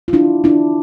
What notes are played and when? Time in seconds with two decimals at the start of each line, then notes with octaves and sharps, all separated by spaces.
0.08 F4
0.13 D4 E4
0.44 D4 E4